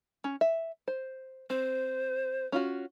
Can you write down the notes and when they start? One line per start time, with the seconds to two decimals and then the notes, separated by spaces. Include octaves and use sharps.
0.24 C#4
0.41 E5
0.88 C5
1.50 C4 C5
2.52 C#4 F4 F#4